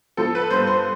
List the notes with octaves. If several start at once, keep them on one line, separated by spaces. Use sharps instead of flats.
F3 A4
B4
G2 C5
C5